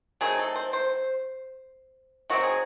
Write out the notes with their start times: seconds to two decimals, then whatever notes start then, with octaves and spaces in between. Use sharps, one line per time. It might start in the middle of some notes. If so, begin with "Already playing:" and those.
0.21 D#3 F#3 A3 C4 G#4
0.39 A4
0.55 C5
0.73 C5
2.30 D#3 F#3 C4 F#4
2.43 G#4